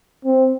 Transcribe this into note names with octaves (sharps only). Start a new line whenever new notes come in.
C4